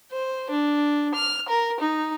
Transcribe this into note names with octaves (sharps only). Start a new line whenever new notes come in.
C5
D4
F6
A#4
D#4